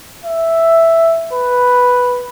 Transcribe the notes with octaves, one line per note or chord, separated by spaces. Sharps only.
E5
B4